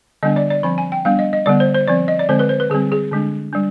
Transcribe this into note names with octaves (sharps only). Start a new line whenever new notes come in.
D3 G3 B3 D4 D#5
D5
D5
F3 C4 B5
G#5
G5
G3 B3 D4 F5
D#5
D#5
D3 G3 B3 D5
C5
C5
F3 C4 D5
D#5
D5
D3 G#3 C4 C5
B4
C5
B4
D3 G3 C4 G#4
G#4
D3 G#3 D4
G3 D4